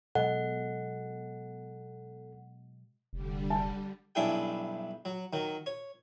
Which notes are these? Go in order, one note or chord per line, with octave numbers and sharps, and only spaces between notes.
B2 F#3 G#3 A4 D#5 F#5
F1 D3 G3
A5
B1 G2 D4 E4 G#4 G5
F#3
D#3 F#3
C#5